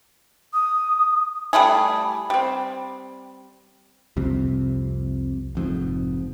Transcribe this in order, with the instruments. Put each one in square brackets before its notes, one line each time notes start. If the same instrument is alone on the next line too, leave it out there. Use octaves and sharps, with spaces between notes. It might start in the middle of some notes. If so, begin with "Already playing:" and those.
[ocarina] D#6
[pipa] G3 A3 E4 G#4
G3 C4
[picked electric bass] C2 F2 C3
F1 F2 G#2